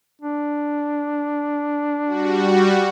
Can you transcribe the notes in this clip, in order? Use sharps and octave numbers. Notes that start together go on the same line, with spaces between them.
D4
G3 F#4